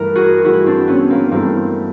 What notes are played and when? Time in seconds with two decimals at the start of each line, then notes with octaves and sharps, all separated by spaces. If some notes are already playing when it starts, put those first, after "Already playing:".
Already playing: G2 E3 A3 A#4
0.15 F#4 G#4
0.45 G2 E3 A3 E4 F#4
0.66 C4 D4
0.88 B3 C#4
1.10 A#3 C4
1.31 G2 E3 A3 A#3 C4